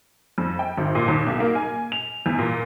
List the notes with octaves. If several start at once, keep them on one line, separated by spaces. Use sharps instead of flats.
F2
G5
G#1
A#2
D#2
B1
A#3
G#5
F7
E2
A#2